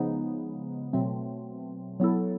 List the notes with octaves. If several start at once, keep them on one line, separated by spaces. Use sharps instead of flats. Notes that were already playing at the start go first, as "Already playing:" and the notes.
Already playing: C#3 F3 G#3 B3 D#4
B2 F#3 A3 C4
F#3 B3 E4 A4